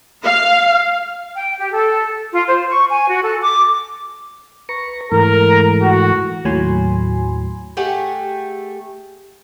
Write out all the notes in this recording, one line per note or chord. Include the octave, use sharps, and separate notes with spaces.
F5
G5
G4
A4
F4
C5
C#6
G#5
F#4
A4
D6
B4 A#5 C#6
G#2 E3 A3 A#4
F#4
D#2 A2 F#3 G#5 B5 C6
A3 G4 G#4 F#5